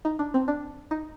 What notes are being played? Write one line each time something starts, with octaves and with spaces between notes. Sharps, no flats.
D#4
D4
C4
D4
D#4